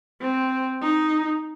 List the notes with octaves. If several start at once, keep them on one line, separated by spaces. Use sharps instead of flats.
C4
D#4